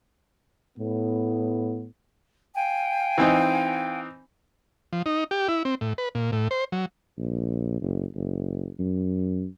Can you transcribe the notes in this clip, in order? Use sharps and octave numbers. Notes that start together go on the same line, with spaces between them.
A2 B3
F5 G5 G#5
E3 C4 D#4
F3
D#4
G4
E4
C4
A2
B4
A#2
A2
C5
F#3
A#1
F#1
F#1
F#2